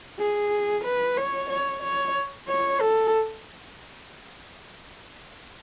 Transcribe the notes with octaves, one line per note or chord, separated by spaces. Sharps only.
G#4
B4
C#5
C#5
C#5
C#5
A4